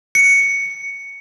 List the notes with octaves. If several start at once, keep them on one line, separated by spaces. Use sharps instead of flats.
C#7